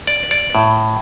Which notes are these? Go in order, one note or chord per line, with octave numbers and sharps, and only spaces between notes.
D5
D5
A2